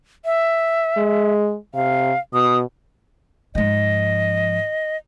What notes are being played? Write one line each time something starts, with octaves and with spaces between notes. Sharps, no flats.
E5
G#3
C3 F5
B2 D#6
G#2 F3 D#5